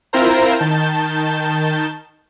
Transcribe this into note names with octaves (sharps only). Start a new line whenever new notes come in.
C4 E4 F4 A#4 C5 A#5
D#3 A5 G6